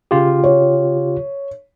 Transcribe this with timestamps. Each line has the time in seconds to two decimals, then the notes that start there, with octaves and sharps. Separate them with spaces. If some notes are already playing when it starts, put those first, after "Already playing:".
0.11 C#3 F4 G4
0.44 C#5